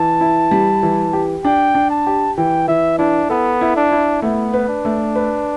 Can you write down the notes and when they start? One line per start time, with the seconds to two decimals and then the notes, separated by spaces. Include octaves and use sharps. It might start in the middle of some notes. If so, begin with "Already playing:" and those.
Already playing: E3 A5
0.21 E4
0.51 G3
0.83 E3
1.13 G4
1.45 D4 G5
1.75 D4
1.90 A5
2.07 G4
2.37 E3 G5
2.68 E3 E5
2.99 D4 E4
3.30 B3 A4
3.61 E4
3.77 D4
3.92 E4
4.22 A3 B3
4.54 B4
4.68 D4
4.85 A3
5.15 B4